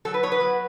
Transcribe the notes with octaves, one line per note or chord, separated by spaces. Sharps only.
F#3 A4
B4
B3 C#5
B4
F#3